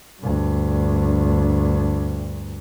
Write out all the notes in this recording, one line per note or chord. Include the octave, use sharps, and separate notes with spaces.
D2 G2